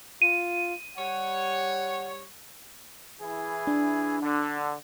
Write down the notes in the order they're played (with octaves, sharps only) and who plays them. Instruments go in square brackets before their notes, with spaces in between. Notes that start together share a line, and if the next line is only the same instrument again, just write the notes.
[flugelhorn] F4 [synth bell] D#7
[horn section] G3 C#5 [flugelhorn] F#5
[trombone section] E3 E4 G#4
[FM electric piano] D4
[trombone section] D3